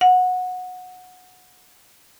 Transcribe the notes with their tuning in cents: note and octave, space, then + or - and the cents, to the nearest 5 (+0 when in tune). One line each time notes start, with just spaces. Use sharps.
F#5 -20